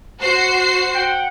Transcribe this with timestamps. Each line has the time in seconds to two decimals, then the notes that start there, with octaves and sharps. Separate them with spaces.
0.20 F#4 C5 C7
0.95 F#5 G5